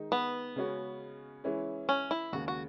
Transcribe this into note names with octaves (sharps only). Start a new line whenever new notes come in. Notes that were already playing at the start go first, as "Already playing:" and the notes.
Already playing: D#3 G#3 D#4
B3
C#3 G#3 C#4 F#4
E3 G#3 C#4 E4
C#4
E4
D#2 C#3 G#3 F#4
F#4